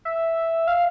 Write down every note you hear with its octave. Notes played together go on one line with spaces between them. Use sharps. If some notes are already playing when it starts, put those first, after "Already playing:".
E5
F5